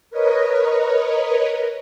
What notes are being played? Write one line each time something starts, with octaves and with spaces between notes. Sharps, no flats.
A#4 B4 C#5 D#5